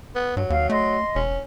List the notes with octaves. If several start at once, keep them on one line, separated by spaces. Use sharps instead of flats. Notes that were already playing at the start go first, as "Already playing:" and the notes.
B3
G2 F#3
D#2 F5
A3 D#5 C6
E1 C#4